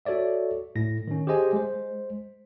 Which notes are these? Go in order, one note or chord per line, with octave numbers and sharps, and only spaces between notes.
F#4 A4 C#5 D5 E5
A2 A#6
D#3 C#4
G4 G#4 C5 D#5 G#5
G#3 C5